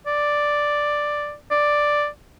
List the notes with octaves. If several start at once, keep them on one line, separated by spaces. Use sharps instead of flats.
D5
D5